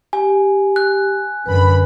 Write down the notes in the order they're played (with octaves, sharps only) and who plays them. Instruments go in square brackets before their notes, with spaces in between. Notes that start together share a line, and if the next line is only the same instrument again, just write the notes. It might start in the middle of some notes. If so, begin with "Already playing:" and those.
[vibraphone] G4 [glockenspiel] G#5
[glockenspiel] F#6
[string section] F#2 D3 B5 [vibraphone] B4